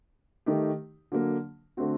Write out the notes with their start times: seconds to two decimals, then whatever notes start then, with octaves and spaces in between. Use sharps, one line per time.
0.46 D#3 A3 D#4 G4
1.12 D3 F#3 A#3
1.77 D3 A3 C4 F#4